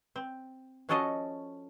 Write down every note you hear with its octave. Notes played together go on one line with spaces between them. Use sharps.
C4
F3 C#4 F#4 A4 D#5 F5